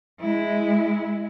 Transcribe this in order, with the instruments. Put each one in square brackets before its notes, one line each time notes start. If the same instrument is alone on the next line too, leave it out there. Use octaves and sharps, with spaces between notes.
[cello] G#3 E4